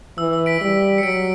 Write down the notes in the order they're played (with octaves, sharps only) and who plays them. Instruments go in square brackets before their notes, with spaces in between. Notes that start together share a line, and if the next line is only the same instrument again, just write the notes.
[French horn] E3 [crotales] E6
[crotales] E6
B6 D7
[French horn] G3 [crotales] B6 D7
[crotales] C#7
[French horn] F#3 [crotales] B6 D7